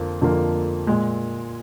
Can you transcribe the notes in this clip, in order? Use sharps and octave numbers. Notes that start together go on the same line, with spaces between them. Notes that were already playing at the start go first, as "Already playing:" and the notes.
Already playing: F2 D3 F3 A#3
F2 D3 F3 A#3
A#2 G#3